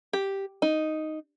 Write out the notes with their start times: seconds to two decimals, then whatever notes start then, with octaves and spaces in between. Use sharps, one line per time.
0.13 G4
0.62 D#4